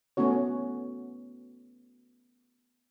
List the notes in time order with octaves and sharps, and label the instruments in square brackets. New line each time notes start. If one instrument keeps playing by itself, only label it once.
[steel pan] A3 B3 C#4 F#4 C#5